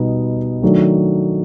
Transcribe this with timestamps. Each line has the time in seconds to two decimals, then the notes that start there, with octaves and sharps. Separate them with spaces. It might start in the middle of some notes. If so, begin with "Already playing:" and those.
Already playing: B2 G3 B3 D#4
0.62 D#3 F#3 A3 D4